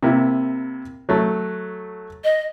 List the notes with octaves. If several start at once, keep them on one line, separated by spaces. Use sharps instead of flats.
C3 A#3 E4
F#3 A3
D#5